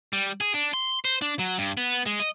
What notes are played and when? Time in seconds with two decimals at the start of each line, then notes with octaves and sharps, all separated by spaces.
0.13 G3
0.41 G#4
0.54 D4
0.74 C6
1.05 C5
1.22 D4
1.39 F#3
1.58 G2
1.77 B3
2.06 G#3
2.20 D#5